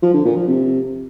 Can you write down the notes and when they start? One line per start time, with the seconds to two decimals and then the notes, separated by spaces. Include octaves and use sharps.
0.02 F3
0.14 D3
0.25 A#2
0.36 F3
0.47 C3